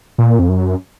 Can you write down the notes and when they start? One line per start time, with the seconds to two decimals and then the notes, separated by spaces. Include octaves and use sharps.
0.18 A#2
0.39 F2
0.49 F#2